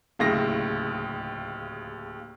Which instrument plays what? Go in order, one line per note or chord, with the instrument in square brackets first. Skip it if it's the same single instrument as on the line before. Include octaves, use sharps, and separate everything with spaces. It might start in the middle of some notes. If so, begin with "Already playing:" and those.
[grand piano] D1 D#2 C#3 E4 A#6